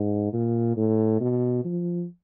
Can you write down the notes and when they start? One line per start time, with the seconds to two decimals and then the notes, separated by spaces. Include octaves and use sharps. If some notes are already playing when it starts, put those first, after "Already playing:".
Already playing: G#2
0.33 A#2
0.76 A2
1.21 B2
1.65 F3